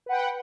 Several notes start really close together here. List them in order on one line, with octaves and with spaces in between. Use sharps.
B4 F#5 G5